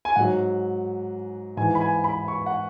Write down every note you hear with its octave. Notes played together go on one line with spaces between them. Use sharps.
G#5
G#2 F#3 F#5
G#2 E3 G#5
B5
G#5
B5
C#6
F#5